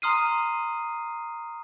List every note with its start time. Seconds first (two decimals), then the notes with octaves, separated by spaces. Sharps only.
0.02 A#5 C6 D#6 F6 C7 D#7